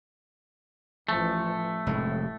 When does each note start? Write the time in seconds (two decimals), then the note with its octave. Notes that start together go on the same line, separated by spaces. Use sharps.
1.09 A1 E3 F3 A3
1.87 F1 A2 G#3